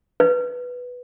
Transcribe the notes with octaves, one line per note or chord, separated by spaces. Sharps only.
B4